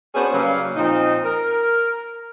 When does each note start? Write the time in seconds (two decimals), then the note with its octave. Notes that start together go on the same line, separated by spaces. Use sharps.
0.15 B3 C#4 D4 F#4 G#4 C5
0.33 C#3 F#3 G3 A#3 C#4
0.76 A#2 F3 C4 D#4
1.25 A#4